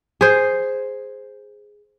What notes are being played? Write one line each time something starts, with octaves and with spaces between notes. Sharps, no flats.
G#4 C5